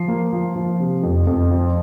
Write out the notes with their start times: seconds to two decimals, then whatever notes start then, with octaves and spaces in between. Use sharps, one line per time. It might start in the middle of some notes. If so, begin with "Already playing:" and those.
Already playing: F3 C7
0.08 A#3
0.33 F3
0.56 F3
0.80 C3
1.03 F2
1.27 F2
1.50 F3